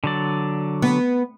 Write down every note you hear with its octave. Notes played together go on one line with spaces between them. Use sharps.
D3 F#3 D5
B3